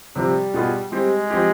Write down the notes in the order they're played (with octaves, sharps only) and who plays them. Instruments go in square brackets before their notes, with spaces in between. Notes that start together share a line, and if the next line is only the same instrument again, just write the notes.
[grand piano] C3 F3 C4 [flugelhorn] G3
[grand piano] B2 B3 F4 G#4
[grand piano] G3 C4 G4 [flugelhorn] G#3
[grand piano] F3 C4 G4